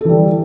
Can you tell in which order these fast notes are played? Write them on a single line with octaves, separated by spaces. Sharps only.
A4 E3 G3